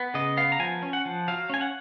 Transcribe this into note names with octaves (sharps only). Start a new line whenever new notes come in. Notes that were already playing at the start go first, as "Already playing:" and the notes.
Already playing: B3
C#3 D#5
B3 F5
A#5
F3 G#5
C#4
F#5
F3
F#3 F5
C#4 G#5
F#5